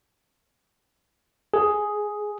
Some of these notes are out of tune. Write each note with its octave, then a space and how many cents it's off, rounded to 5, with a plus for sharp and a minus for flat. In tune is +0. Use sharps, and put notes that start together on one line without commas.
G#4 +5